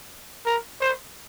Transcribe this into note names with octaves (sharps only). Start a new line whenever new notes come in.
A#4
C5